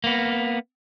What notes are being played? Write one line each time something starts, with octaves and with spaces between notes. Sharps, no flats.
A#3 B3